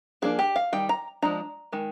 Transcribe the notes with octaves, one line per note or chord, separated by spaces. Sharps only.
F3 A#3 D4 G#4
G4
F5
D#3 G3 G5
A#5
F3 G#3 D4 A#5
D#3 G#3